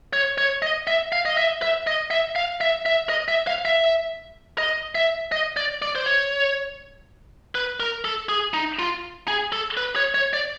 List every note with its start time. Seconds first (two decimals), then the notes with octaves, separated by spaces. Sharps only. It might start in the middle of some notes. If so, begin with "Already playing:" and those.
0.13 C#5
0.38 C#5
0.62 D#5
0.87 E5
1.12 F5
1.26 D#5
1.37 E5
1.62 E5
1.87 D#5
2.11 E5
2.36 F5
2.61 E5
2.86 E5
3.09 D#5
3.28 E5
3.47 F5
3.65 E5
4.58 D#5
4.95 E5
5.32 D#5
5.57 D5
5.82 D5
5.95 C5
6.06 C#5
7.55 B4
7.80 A#4
8.05 A4
8.29 G#4
8.54 D#4
8.79 F4
9.28 G#4
9.52 A4
9.77 B4
9.96 C#5
10.15 C#5
10.33 D5